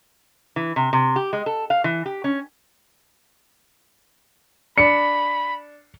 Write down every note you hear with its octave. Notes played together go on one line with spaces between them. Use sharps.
E3
C3
C3
G4
G#3
A4
F5
E3
G4
C#4
D4 B5 C#7